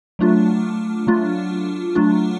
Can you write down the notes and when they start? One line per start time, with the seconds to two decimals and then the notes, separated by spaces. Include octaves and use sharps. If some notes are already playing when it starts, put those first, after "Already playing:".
0.19 F#3 A3 D4 F4
1.07 F#3 A3 D4 F4
1.95 F#3 A3 D4 F4